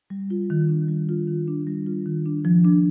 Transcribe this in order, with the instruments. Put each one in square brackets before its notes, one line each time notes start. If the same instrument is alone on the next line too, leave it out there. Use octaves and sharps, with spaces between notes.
[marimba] G3
F4
D#3
D4
G3
F4
D#3
D4
G3
F4
D#3
D4
F3
D4